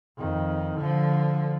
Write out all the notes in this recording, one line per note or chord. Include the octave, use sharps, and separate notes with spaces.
F2 D#3
D3 F3